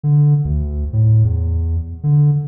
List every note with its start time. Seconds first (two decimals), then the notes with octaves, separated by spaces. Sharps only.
0.03 D3
0.45 D2
0.93 A2
1.24 E2
2.03 D3